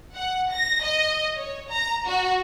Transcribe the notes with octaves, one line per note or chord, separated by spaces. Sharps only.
F#5
A#6
D#5
C#5
A#5
F#4